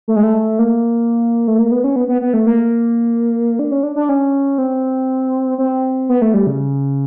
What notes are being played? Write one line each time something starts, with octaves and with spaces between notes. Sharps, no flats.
A3
G#3
A3
A#3
A3
A#3
B3
C#4
B3
B3
B3
A3
A#3
D4
C#4
D4
D4
C#4
C4
C4
B3
A3
G3
C#3